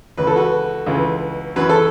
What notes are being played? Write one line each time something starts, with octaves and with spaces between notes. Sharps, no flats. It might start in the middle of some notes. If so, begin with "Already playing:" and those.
C#2 C#3 E3 B4
A4
F#4 B4
C#2 C#3 E3
F#2 E3 B4
A4